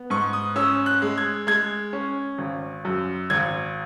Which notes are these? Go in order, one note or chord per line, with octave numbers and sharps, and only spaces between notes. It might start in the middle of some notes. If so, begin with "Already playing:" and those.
Already playing: B3
G#2 C#6
D#6
C#4 E6
F#6
G#3
G#6
G#3 G#6
C#4
G#1
F#2
G#1 G#6